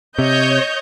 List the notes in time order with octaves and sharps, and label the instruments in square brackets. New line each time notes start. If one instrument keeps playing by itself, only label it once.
[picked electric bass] C3 [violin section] C#5 D#5 G6